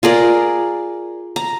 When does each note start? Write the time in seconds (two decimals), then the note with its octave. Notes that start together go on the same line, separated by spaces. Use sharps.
0.03 F4 G#4 A#4 D5
1.36 A#5